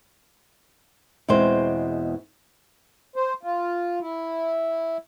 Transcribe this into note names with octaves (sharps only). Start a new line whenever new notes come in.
E2 B2 G#3 C4 C5
C5
F4
E4